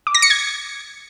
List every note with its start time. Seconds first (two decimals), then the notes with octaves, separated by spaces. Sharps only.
0.07 D6
0.14 A#6
0.22 C#7
0.30 G#6